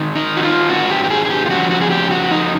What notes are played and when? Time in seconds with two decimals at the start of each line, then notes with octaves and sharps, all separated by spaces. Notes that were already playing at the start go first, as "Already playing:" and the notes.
Already playing: G#2 D#3
0.15 D#4
0.37 F#4
0.43 F4
0.69 G#2 D#3 F#4
0.90 G4
1.04 G4
1.10 G#4
1.25 G#4
1.30 G4
1.46 F4
1.50 F2 C#3 F3 F#4
1.71 F#4
1.81 G#4
1.91 G4
2.11 F#4
2.31 F2 C#3 D#4